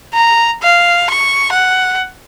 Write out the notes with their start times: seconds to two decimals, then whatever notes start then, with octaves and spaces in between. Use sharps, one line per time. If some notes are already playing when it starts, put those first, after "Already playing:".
0.14 A#5
0.62 F5
1.10 C#6
1.52 F#5